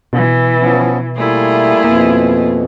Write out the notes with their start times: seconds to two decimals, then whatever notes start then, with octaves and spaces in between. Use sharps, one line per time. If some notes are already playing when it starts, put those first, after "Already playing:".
0.13 B2 E3
0.61 F3 B3 C#4
1.16 G3 A3 A#3 E4 F4 G#4
1.84 F2 B2 A#3